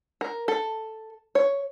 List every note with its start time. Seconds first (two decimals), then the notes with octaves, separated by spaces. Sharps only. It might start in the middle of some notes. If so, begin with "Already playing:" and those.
0.21 A#4
0.48 A4
1.35 C#5